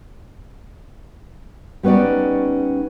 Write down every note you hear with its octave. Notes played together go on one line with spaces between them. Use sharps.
G3 B3 C#4 D#4 D5